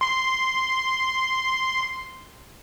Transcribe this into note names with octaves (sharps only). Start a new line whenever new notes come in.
C6 C7